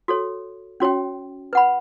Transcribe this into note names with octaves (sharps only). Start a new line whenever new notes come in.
F#4 A4 C#5
C#4 F#4 C#5 G5
B4 F#5 B5